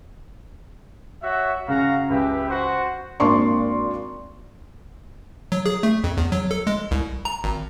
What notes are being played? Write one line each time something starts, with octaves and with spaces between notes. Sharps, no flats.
F#4 C#5 E5
C#3 F#4 F5 A#5
C#2 G4 B4 E5
F#4 C5 F#5
G#1 A#3 D4 D5 C6 C#6
F#3
G#4
A3
F2
E2
F#3
A4
G#3
C2
A#5
G#1